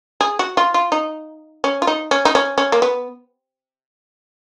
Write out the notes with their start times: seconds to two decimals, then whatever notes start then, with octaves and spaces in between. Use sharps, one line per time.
0.21 G#4
0.39 F#4
0.57 F4
0.74 F4
0.92 D#4
1.64 C#4
1.82 F4
1.87 D#4
2.11 C#4
2.25 D#4
2.35 C#4
2.58 C#4
2.72 A#3
2.82 B3